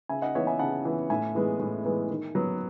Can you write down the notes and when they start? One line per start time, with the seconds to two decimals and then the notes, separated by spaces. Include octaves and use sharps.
0.09 C#3 E5 G#5
0.22 D#5 F#5
0.35 E3 B3 C#5 E5
0.47 E5 G#5
0.59 C#3 F#5 A5
0.85 E3 B3
1.10 A2 E5 G#5
1.35 E3 G#3 B3
1.60 A2
1.85 E3 G#3 B3
2.10 D#3
2.35 F#3 B3